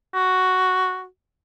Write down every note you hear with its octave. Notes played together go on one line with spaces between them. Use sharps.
F#4